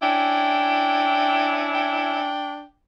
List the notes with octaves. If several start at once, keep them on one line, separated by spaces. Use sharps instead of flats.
C#4 D4 E4 G5
G5